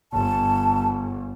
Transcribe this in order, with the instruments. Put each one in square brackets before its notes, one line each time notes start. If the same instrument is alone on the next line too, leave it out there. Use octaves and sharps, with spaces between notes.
[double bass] G1 [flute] A5